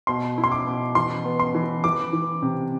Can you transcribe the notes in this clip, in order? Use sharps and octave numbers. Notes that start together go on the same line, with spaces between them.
B2 C6
E4
C6
D6
B2
E3 C6
B3
C6
E3
E3 D6
E3
C3